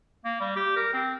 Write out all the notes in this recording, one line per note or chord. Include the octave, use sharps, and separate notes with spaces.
A#3
G3
G4
A#4
C4